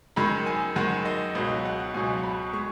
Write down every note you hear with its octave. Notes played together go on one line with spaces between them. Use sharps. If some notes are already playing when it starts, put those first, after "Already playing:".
F#2 D#3 G#3 B5
G#5
F#2 D#3 G#3 F#5
D#5
C#2 B2 F#3 D#5
F#5
C#2 B2 F#3 G#5
B5
G#3 C#6